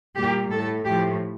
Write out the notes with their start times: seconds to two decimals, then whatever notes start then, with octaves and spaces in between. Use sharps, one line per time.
0.16 A#2 G3 A#3 G4
0.50 A2 A3 A4
0.84 A2 F3 A3 G4